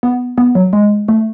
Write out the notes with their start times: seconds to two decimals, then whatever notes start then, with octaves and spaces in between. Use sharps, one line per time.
0.03 B3
0.38 B3
0.55 F#3
0.73 G#3
1.08 A3